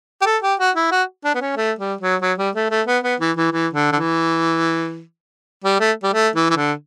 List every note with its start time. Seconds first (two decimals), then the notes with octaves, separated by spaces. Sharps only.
0.22 G4
0.26 A4
0.43 G4
0.59 F#4
0.76 E4
0.91 F#4
1.24 D4
1.34 B3
1.41 C#4
1.56 A3
1.79 G3
2.01 F#3
2.21 F#3
2.38 G3
2.55 A3
2.70 A3
2.87 B3
3.04 B3
3.20 E3
3.37 E3
3.52 E3
3.73 D3
3.92 D3
3.95 E3
5.64 G3
5.80 A3
6.03 G3
6.13 A3
6.35 E3
6.50 E3
6.57 D3